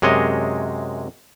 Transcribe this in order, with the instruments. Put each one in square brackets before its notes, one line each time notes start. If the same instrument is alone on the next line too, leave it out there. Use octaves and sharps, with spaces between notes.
[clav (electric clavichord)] F#2 C3 G#3 C#5 D#5